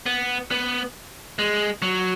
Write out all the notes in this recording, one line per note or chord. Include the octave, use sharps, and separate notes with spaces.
B3
B3
G#3
F#3